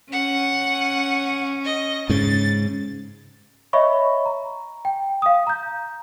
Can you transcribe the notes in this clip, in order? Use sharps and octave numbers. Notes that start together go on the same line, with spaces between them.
C#4 F#5
D#5
G#2 C#3 A6
C#5 D#5 E5 B5 C#6
A#5
G5
F5 D#6
A#5 G6